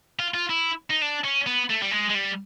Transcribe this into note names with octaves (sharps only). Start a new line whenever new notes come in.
F4
F4
E4
D#4
D4
C#4
B3
A3
G3
G#3
G#3
G3